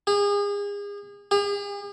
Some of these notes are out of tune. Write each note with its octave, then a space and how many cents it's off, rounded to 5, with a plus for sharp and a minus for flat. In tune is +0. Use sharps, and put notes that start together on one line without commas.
G#4 -35
G#4 -45